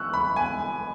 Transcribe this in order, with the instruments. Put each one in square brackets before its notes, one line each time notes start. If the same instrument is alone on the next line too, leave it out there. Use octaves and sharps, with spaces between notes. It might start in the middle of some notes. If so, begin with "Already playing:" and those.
Already playing: [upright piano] C#6 E6 F#6
B5
G#5